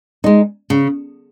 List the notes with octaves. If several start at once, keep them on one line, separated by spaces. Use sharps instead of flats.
G#3 D#4
C#3